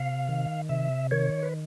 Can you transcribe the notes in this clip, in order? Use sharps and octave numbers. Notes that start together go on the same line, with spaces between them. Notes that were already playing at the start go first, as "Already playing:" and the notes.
Already playing: C3 F5
D#3
C3 E5
D#3 C#5
B4